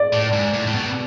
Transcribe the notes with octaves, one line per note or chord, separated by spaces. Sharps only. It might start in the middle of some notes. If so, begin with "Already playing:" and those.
Already playing: D5
A2
G#2
A2
A2
B2